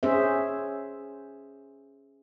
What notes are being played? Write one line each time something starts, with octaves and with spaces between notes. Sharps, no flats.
C#4 G#4 C5 E5